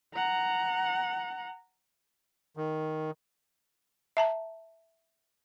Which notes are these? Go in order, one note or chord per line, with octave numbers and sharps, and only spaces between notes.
F#5 A#5
D#3
E5 A5 A#5